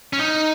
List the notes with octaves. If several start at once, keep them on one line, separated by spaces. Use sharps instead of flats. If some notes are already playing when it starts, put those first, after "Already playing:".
C#4
D#4